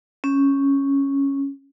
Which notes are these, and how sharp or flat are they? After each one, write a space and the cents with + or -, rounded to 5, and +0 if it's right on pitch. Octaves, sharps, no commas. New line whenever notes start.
C#4 -5